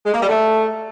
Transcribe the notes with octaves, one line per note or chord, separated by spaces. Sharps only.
G#3
A#3
G3
A3